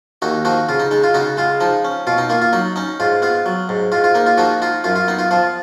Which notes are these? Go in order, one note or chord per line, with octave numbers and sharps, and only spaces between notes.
D#2 D#4 F#4
F3 D#4 F#4
C#3 F4
D#4
G#3 D#4
F4
C#3 D#4 F#4
G#3 F4
F3 D#4
C#4
B2 F4
D#4
A#3 F4
F4
F#3 D#4
C#4 D#4
G#2 F4
B3 F4
F#3
G#2
G#2 F4
F4
A#3 D#4
F4
F3 D#4 F#4
D#4 F4
F#2 F4
F4
B3 D#4
F4
F3 F4